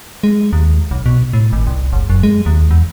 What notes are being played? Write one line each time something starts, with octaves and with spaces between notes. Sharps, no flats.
G#3
D#2
B1
B2
A2
G#1
C2
F#1
F#2
G#3
D#2
E2